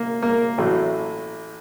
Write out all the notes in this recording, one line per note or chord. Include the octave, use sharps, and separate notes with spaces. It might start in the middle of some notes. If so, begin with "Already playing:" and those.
Already playing: A#3
A#3
A1 A2 F#3